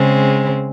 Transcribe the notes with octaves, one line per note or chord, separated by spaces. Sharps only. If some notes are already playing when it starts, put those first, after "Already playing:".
Already playing: C#3 G#3 C4